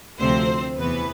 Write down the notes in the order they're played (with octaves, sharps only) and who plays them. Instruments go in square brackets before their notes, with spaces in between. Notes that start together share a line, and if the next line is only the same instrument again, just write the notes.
[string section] D2 C3 F3 C4 C5
E2 C3 E3 B3 B4